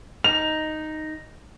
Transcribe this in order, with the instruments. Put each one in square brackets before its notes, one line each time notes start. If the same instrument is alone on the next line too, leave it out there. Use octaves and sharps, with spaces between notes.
[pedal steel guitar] D#4 [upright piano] F7